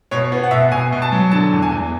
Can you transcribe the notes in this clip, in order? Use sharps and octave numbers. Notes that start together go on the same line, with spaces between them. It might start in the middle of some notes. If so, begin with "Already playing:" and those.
B2 C#5
B3
F#5
B2 E5
B2 G#5
B2
A5
F#3
D3 A5
E2
G#5
E2